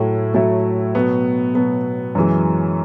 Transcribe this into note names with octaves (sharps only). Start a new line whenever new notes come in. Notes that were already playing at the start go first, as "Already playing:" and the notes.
Already playing: A2 F#3 A3 E4 A4
A2 F#3 A3 E4 A4
B2 F#3 B3
B2 F#3 B3
F#2 E3 G#3